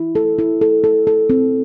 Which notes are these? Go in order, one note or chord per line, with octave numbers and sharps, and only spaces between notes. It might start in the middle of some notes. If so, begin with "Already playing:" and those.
Already playing: E4
A4
E4
A4
A4
A4
C4